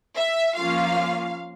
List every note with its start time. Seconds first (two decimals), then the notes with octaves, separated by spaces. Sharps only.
0.16 E5
0.57 F3 A#3 C#4 F4 F5